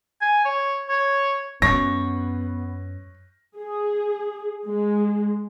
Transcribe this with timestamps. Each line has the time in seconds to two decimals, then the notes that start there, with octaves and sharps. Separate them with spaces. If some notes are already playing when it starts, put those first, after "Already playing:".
0.21 G#5
0.45 C#5
0.89 C#5
1.62 F#2 B3 C#5 A#6
3.57 G#4
4.68 G#3